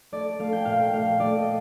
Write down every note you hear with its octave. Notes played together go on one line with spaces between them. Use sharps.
A3 D5
A3 F5
G5
A#2 F5
G5
A3 F5
A3 D5
D#5